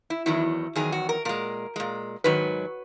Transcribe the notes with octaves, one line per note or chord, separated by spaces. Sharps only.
E4
E2 D#3 F#3 E4
E2 D#3 F#3 G#4
F#4
A#4
A#2 G#3 A#4
A#2 G#3
G#2 D#3 F#3 B4